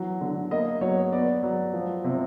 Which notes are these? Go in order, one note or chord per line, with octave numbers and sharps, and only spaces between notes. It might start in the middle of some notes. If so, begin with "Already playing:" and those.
Already playing: E3 F#3
D3
A#3 D#5
F#3 C#5
B3 D5
F#3
F3
C3